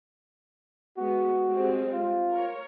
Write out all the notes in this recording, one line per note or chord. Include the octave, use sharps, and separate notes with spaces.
G#3 B3 F#4
G3 G#3 C4
F4
A#4 C#5